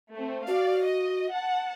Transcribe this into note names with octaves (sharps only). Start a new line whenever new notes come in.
A3 C4
F#4 D5 F5
D#5
F#5 A5